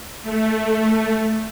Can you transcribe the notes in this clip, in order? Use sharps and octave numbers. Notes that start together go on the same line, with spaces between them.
A3